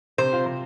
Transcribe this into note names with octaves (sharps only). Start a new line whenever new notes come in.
C3 C5
F4
C3